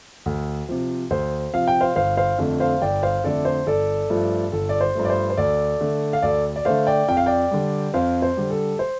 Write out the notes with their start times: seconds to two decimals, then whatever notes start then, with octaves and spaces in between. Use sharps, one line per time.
0.26 D2
0.69 C3 F3
1.10 D2 C5
1.54 C3 F3 F5
1.68 G5
1.80 C5 F5
1.96 G1 C5 F5
2.17 C5 F5
2.38 F2 D3 A3
2.60 C5 F5
2.82 G1 D5 G5
3.03 C5 F5
3.24 F2 D3 A3 A4 D5
3.45 C5
3.67 G1 A4 D5
4.10 G2 F3 A3
4.52 G1 A4
4.69 D5
4.81 C5
4.95 G2 F3 A3
5.05 D5
5.10 C5
5.30 C5
5.37 D2 A4 D5
5.80 D3 A3
6.13 F5
6.22 D2 A4 D5
6.56 D5
6.65 D3 A3 C5 F5
6.87 D5 G5
7.08 F2 G5
7.17 F5
7.26 D5 G5
7.51 D3 G3
7.94 F2 C5 F5
8.22 C5
8.37 D3 G3
8.50 A4
8.79 C5